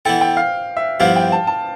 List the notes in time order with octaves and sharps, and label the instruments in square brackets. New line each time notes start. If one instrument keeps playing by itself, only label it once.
[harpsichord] E3 B3 E4 A4 [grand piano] G5
[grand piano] G5
F5
E5
[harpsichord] G2 F3 B3 E4 G4 [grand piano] F5
[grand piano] G5
A5
A5